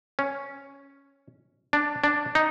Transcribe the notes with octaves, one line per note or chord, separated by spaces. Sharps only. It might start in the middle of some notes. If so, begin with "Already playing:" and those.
C#4
D4
D4
D#4